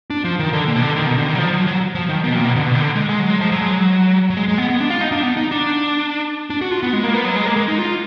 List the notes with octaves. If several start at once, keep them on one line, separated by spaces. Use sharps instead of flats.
D4
F3
D#3
D3
A#2
B2
D3
D#3
B2
D3
D#3
F#3
F3
F#3
F#3
F3
D#3
B2
A#2
B2
D3
B2
D#3
D3
G#3
G#3
F#3
G#3
F3
F#3
G#3
F#3
F#3
G#3
G#3
B3
B3
D4
F4
D#4
D4
B3
D#4
D4
D4
F#4
F4
B3
G#3
A#3
B3
F#3
G#3
A#3
G#3
D#4
F4